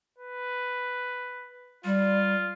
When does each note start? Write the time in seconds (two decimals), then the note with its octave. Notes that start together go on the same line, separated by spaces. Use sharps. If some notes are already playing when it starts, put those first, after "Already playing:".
0.18 B4
1.85 G3 F4